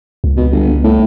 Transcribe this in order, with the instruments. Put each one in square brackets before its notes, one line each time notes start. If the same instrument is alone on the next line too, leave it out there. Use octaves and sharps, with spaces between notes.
[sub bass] C#2
[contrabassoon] B2
G1
A2